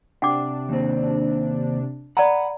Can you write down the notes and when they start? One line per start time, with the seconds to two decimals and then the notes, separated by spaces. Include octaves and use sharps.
0.22 C3 D4 F#5 G5 D6
0.69 D#2 C4
2.17 D5 F#5 A#5 B5